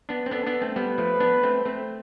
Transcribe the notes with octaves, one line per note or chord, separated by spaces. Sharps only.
B3 D4
C4
B3 D4 A4
B3 D4
A3 C4
G3 B3 B4
F3 A3
B3 D4
A3 C4
A3 C4